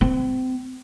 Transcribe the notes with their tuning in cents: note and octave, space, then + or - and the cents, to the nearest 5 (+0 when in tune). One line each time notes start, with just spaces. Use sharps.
C4 -30